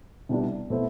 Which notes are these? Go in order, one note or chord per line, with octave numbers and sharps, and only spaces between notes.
C2 B2 G3 D4
B2 A3 C4 E4